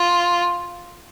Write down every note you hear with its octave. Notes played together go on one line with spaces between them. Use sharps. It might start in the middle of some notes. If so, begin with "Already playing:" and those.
Already playing: F4